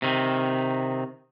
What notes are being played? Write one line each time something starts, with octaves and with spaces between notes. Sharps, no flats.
C3 D#3